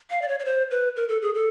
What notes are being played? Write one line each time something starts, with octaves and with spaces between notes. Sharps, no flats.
F5
D5
C#5
C#5
C5
B4
A#4
A4
G#4
A4